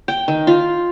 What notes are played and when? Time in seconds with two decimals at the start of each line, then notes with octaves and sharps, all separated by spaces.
0.08 G5
0.28 D#3
0.47 F4